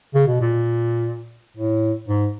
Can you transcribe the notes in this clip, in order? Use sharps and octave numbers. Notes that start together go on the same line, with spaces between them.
C#3
B2
A#2
A2
G#2